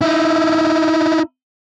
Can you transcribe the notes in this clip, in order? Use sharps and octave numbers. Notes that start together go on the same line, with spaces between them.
D#4 E4